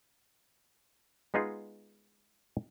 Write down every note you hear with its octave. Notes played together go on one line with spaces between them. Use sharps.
G#3 B3 D#4 F4 G#4